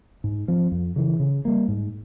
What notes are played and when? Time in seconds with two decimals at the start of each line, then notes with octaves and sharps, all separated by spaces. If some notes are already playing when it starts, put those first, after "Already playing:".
0.24 G#2
0.48 F3 C4
0.72 F2
0.96 C#3 E3
1.20 C#3
1.45 G3 A#3
1.68 G#2